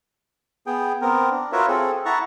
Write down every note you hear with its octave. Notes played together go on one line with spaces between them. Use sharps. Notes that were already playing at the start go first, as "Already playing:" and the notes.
B3 G#4 G5
B3 C4 A#4
D4
F4 F#4 A#4 B4 C#5 E5
C4 G#4 A4
E4 E5 F#5 A5 A#5 C#6